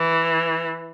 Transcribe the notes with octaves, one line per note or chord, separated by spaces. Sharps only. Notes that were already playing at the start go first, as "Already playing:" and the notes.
Already playing: E3